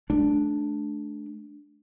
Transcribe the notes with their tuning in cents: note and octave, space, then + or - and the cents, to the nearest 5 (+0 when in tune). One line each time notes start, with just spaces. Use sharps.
A3 -35 D4 +0